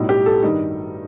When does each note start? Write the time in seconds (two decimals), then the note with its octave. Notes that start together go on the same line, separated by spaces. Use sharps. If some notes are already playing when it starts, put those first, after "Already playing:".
Already playing: B1 A2 G3 D#4
0.09 G4
0.26 A4
0.43 G2 D#3 G3 D#4